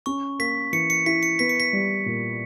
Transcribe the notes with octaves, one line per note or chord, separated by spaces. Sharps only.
C#4 C#6
A#3 B6
E3 C#7
C#7
E4 B6
C#7
B3 B6
C#7
B6
G3
A#2